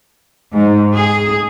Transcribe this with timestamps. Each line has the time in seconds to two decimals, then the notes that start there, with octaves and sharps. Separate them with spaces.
0.55 G#2
0.95 G#4